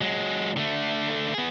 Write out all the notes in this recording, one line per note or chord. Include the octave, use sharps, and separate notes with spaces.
F#3 G#3
D3 A3
B3 G#4